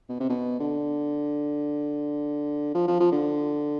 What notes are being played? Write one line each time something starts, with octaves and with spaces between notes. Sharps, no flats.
B2
C3
B2
D3
F3
F3
F3
D3